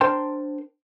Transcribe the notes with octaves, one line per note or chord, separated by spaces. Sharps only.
D4 A#4 C5 G5 A5 C6